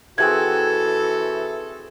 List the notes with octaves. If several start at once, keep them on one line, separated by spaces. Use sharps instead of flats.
E3 C4 F#4 G#4 A4 F#5 G#6